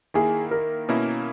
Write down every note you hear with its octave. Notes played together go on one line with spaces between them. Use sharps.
D#3 A#3 E4 G#4
A#4
B2 A#3 C#4 E4